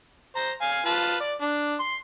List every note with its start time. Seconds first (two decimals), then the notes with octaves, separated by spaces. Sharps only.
0.36 C5 A#5
0.62 F5 G#5
0.86 F4 B4 A5
1.21 D5
1.41 D4
1.80 C6